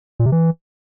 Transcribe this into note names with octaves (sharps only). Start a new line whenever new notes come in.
A#2
C3
E3